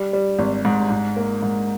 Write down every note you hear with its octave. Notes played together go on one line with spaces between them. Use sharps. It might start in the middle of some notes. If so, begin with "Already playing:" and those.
Already playing: G3
G3
G#1
G#2
G#2
A#3
G#2